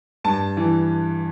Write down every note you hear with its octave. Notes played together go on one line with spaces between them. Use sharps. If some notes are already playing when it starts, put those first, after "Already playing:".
G2 A5
E3